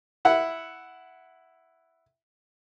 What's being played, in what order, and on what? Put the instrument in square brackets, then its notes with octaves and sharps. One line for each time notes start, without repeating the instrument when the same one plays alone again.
[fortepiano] E4 F#5